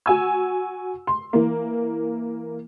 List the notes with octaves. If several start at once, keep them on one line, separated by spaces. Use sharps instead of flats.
F#4 G#5 E6
C6
E3 A#3